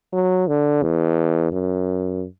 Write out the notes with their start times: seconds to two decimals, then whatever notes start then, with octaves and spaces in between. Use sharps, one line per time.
0.13 F#3
0.48 D3
0.82 E2
1.52 F#2